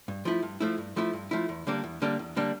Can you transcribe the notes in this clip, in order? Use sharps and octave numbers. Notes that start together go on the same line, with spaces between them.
G2
F3 A3 E4
G2
F3 A3 E4
G2
F3 A3 E4
G2
F3 A3 E4
E2
D3 G3 A#3 D4
E2
D3 G3 A#3 D4
E2
D3 G3 A#3 D4